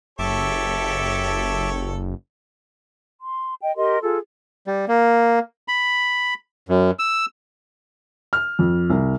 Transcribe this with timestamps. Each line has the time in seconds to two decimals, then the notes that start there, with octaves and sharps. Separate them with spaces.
0.19 F#1 G4 A4 C#5 E5 A5 D6
3.21 C6
3.61 D#5 G5
3.75 G4 A#4 D#5 C6
4.02 F4 G#4 A4
4.67 G3
4.88 A#3
5.68 B5
6.69 F#2
6.99 E6
8.33 F6
8.59 F2
8.90 C2